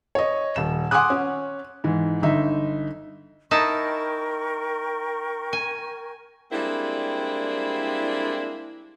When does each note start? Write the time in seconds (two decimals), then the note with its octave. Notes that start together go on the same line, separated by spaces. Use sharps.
0.15 C#5 D#5
0.56 D#1 E7
0.91 F#5 G#5 C6 D6 D#6 F#6
1.10 C#4
1.84 G#2 E3
2.22 G1 D#4 E5
3.51 D#4 E4 A#4 G5 A5 C#6
5.53 G#5
6.52 G3 G#3 A#3 C4 D4 E4